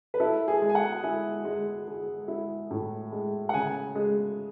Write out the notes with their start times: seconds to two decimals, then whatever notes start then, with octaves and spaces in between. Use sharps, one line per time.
0.14 B4
0.20 E4 A4
0.48 G#4
0.62 G#3
0.69 G#5
0.75 F#5
1.04 E4 G#5
1.45 G#3
1.87 G#3
2.28 E4
2.71 A2
3.12 G#3
3.49 F#5
3.54 C#3 G#5
3.95 G#3